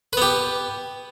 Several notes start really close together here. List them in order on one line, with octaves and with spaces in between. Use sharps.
B4 B3 G4